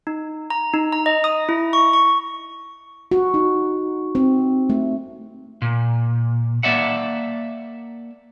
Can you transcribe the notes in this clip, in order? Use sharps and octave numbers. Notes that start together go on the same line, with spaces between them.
D#4
A#5
D#4
A#5
D#5
D#6
E4
C#6
C#6
F#4
D#4
C4
A3
A#2
A#3 D5 E5 F#5